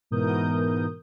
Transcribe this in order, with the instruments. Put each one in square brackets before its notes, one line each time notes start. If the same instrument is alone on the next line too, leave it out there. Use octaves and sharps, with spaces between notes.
[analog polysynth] G#2 B2 E3 A#4 D#6 G6